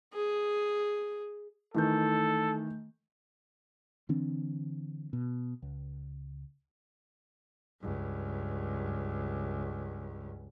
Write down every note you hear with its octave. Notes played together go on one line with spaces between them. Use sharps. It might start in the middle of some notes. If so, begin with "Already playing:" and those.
G#4
D#3 E3 A3 A4 G6
D3 E3 C4 D4
B2
C#2
C#2 G2